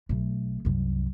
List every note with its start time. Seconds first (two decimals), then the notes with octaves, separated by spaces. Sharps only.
0.09 B1 A3
0.65 C2 F#2